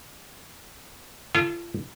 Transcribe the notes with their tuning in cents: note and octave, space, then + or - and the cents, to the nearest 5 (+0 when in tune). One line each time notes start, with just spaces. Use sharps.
F4 -40 A4 +0 D#5 -5